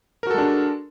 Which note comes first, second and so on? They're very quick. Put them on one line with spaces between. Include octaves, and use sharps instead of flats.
A#4 F#4 A4 G#3 D4